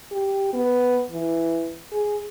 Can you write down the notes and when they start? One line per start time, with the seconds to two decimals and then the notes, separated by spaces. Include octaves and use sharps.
0.12 G4
0.53 B3
1.11 E3
1.92 G#4